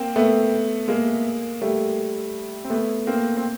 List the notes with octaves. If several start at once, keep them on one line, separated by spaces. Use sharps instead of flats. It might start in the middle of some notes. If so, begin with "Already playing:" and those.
Already playing: A#3 C4
A3 B3
G#3 A#3
G3 A3
C4
A3 B3
A#3 C4
C4